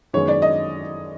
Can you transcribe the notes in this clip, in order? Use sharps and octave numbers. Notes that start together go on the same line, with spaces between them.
F#2 D#3 G#3 B3 C#5
D5
D#5